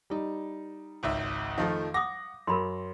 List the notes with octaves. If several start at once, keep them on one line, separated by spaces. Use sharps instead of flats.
G3 D#4
G#1 C#2 E5
F2 D#3 F3 A3 F5
F#5 D6 D#6 A#6
F#2 A#4 B5 C6